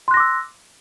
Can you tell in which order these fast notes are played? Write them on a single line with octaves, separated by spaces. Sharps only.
C6 F#6 A#6 D6 E6